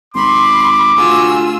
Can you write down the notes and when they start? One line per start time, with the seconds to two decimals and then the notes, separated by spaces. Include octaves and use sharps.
0.14 G#1 B5 C6 D6
0.96 D2 F4 F#4 G#4 E6